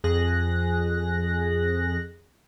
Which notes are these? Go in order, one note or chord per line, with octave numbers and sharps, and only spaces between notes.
F2 G#4 F#6 A#6